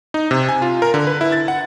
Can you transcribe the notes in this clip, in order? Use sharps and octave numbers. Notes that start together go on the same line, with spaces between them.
D#4
C3
G#5
F4
A#4
D3
B4
E4
A6
F#5